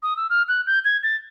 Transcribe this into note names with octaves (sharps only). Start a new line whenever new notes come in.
D#6
E6
F6
F#6
G6
G#6
A6